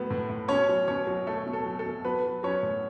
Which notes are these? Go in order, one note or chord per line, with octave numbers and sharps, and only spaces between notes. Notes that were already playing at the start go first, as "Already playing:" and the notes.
Already playing: A2 F#3 B3
A2
A2
B2 C#4 C#5
F#3
B2 C#4 C#5
F#3
A3 A4
B2
A4
F#3
A4
B2
F#3 B3 B4
F#3
F#3 C#4 C#5
A2